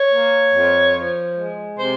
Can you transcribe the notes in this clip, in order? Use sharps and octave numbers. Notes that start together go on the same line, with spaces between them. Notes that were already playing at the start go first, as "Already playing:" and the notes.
Already playing: C#5
A#3
F2
F3
G#3
C3 C5